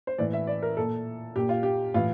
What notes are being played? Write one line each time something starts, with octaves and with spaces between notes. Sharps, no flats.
C5
A2 E3 D5
E5
D5
A#4
A#2 A4
A#2 G4
F4
G4
A2 E3 F4